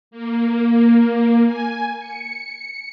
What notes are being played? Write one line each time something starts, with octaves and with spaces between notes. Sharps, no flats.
A#3
G#5
C#7